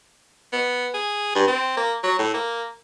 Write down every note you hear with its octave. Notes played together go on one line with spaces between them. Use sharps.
B3
G#4
G2
C4
A#3
F#3
A2
A#3